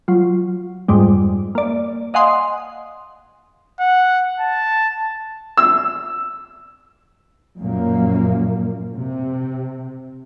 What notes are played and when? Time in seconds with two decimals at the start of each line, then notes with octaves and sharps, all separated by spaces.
0.08 F#3 F4
0.88 F2 G#2 G3 G#3
1.55 A#3 D5
2.14 D#5 F5 F#5 G#5 C6 D#6
3.80 F#5
4.40 A5
5.57 E6
7.60 F#2 A#2 F3 A#3
8.94 C3